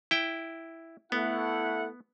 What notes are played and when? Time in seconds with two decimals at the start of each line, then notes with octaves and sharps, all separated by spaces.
0.11 E4 G5
1.12 A3 B3 E4 F#5